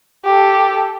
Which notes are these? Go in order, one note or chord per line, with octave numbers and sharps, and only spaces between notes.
G4 A4